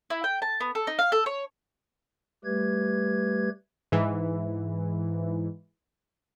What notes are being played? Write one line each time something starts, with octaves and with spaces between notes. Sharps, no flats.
E4
G5
A5
B3
A4
D#4
F5
A4
C#5
G3 A3 G4 B4 G#6
G#2 E3